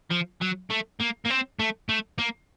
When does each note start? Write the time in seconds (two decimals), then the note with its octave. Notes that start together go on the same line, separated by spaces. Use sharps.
0.11 F3
0.41 F#3
0.70 A3
1.00 A#3
1.25 A#3
1.30 C4
1.59 A3
1.89 A3
2.18 A#3